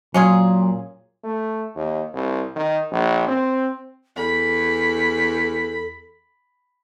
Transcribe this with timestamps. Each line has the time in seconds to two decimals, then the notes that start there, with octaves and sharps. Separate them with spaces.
0.14 A#2 F#3 C#4 F4 G#4
1.24 A3
1.75 D#2
2.14 C2
2.56 D#3
2.91 A#1
3.27 C4
4.17 E2 A4 B5